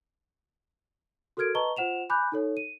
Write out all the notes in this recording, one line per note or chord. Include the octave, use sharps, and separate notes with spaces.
F#4 A4 A#4 F6 G#6 D7
B4 D#5 A5 A#5 C#6 G7
F4 C5 F#5 E7 F7
G#5 B5 D6 F#6 G6
D#4 A4 C#5
D#7